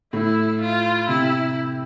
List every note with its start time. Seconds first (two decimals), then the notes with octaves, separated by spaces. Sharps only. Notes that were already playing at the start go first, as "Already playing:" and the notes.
0.13 A2 E4
0.61 F4
1.08 C3 E4